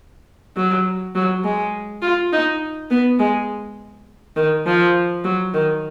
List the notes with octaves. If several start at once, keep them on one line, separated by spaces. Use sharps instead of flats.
F#3
F#3
G#3
F4
D#4
B3
G#3
D#3
F3
F#3
D#3